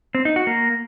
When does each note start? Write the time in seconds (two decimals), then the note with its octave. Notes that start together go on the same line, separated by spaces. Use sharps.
0.15 C4
0.25 D#4
0.36 F#4
0.47 A#3